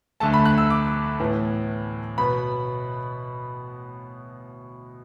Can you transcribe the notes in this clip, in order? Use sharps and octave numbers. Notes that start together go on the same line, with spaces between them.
D2 D3 A3 A5
B5
F#6
E6
D6
A2 E3 B3
B2 B3 B5